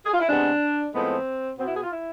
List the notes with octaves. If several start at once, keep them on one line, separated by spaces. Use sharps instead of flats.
G#4
F4
E4
C3 G#3 B3 D4
A2 F3 G#3 B3 C4
B2 B3 C4
E4
G#4
F4
E4